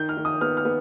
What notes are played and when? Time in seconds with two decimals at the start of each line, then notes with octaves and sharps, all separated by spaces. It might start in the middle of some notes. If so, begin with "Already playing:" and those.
Already playing: D#3 G6
0.09 F6
0.17 D#3
0.25 D#6
0.41 B3 F6
0.57 F6
0.65 B3